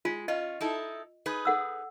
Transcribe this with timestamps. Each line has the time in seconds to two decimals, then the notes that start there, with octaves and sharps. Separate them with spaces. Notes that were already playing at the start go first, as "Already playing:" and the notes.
0.05 G#3 F4
0.28 C#4 F4 D#5
0.61 D#4 E4 A4
1.26 D#4 G#4 B4
1.45 A4 F#5 E6